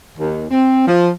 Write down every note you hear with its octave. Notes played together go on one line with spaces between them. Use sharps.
D#2
C4
F3